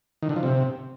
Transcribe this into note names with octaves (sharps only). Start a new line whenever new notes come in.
D#3
D3
F3
C3